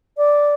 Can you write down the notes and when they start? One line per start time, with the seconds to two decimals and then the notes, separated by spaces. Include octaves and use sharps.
0.17 D5